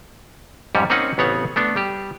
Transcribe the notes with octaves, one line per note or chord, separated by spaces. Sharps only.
F2 G#2 G3 C#4
A#3 C4 C#4 D#4 F#5
A1 C#3 B3 C4 C#5 F#5
A3 B3 D4
G3 G4